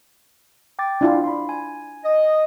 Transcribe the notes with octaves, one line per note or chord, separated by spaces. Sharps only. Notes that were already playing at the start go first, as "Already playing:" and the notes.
G5 D6 A6
D4 E4 F4
B5 C6
G#5
D#5